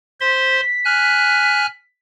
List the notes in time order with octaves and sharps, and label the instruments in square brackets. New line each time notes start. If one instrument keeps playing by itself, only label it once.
[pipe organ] C5 C6 [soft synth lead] B6
[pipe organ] G#5 F6 F#6